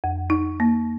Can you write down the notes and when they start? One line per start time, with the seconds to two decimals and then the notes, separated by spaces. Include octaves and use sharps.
0.04 F2
0.30 D#4
0.60 A#3